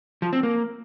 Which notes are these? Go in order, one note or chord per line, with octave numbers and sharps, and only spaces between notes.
F3
C4
A#3